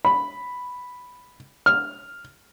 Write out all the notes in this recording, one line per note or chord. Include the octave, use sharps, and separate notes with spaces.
B5
F6